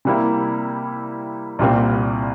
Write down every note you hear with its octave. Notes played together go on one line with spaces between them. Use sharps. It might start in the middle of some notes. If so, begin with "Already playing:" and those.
C3 G3 A#3 E4
C2 A#2 G3 C4